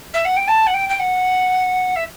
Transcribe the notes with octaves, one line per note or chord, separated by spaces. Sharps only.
E5
F#5
G5
A5
F#5
G5
G5
F#5
E5